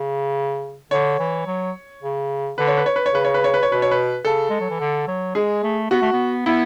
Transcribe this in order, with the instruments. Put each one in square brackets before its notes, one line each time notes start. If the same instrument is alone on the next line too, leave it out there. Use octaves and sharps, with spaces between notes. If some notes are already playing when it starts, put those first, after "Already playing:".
Already playing: [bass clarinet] C#3
[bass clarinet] D3 [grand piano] C#5
[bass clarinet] E3
F#3
C#3
[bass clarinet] D3 [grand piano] B4
[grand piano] C#5
B4
C#5
B4
C#5
[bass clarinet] C#3 [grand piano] B4
[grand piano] C#5
B4
C#5
B4
C#5
[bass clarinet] B2 [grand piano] B4
[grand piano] C#5
B4
[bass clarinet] C#3 [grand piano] A4
[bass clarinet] G#3
F#3
E3
D3
F#3
[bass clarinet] G#3 [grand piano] G#4
[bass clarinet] A3
[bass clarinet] B3 [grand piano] F#4
[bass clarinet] A3
B3
[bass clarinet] B3 [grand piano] E4